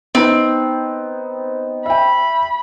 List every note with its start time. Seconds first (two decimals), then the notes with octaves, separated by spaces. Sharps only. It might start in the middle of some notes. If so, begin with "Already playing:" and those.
0.15 B3 C4 D#4
1.86 E5 G5 B5